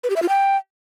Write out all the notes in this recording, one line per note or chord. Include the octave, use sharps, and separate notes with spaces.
B4
G4
E5
F4
G5